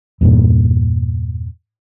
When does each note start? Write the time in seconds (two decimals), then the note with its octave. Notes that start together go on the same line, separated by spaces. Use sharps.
0.21 E2 G2 A#2